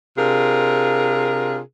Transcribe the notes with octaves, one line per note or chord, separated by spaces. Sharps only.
C3 D4 F4 G#4 A#4